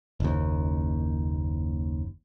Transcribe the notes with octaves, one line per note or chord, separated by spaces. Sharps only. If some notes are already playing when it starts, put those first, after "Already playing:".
F#1 D#2